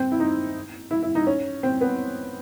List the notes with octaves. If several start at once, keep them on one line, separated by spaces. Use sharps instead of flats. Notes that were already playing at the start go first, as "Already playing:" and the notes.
Already playing: C4
E4
D#4
E4
E4
D#4
C#4
C4
B3